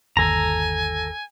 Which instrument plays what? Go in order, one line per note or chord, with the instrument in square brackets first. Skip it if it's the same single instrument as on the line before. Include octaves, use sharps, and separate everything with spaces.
[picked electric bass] G1 D#2 [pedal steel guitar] A4 A#5 [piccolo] G#5